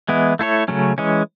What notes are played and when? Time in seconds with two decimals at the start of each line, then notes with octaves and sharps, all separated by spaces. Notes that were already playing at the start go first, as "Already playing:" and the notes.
0.09 E3 G#3 B3 E4
0.39 A3 E4 A4 C#5
0.68 C#3 F#3 A3 C#4
0.98 E3 G#3 C#4